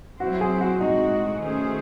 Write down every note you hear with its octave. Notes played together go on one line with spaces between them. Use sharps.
F#3 C4 E4 F#4 C5
G#4
F#4
A2 G#3 C4 D#4 F#4
D#3 A3 C#4 G#4 C5